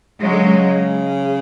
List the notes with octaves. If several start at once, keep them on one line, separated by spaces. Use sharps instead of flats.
C#3 F#3 G#3
D3
C#3